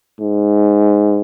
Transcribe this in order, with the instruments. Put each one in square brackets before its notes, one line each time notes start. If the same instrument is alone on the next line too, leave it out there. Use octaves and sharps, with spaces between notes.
[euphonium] G#2